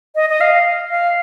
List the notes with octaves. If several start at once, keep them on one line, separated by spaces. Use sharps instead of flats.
D#5
D#5
F5
F5